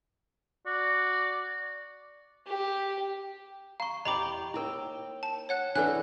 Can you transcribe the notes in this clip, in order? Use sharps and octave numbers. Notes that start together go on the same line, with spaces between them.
F#4 D5
G4
F5 A#5 C#6
E2 G4 D#5 G5 A#5 B5 D6
D#2 E4 A#4 G5
A5
C#5 F#5 F#6
E3 D4 F#4 A4 B4 D5 F#6